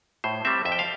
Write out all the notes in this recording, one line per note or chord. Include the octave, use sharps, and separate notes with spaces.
A2 C5
G3 C4 E5
F2 E5
G5
F5